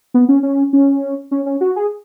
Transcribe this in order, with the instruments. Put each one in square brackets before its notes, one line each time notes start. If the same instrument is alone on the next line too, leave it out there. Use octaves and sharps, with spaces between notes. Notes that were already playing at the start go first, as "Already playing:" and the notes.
[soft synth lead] B3
C#4
C#4
C#4
C#4
C#4
F#4
G#4